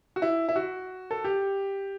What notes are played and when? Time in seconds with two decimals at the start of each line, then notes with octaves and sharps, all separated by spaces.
0.16 F#4
0.22 E4
0.49 E4
0.56 F#4
1.11 A4
1.25 G4